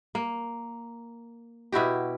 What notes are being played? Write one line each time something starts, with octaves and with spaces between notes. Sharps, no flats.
A#3
B2 E4 F#4 G4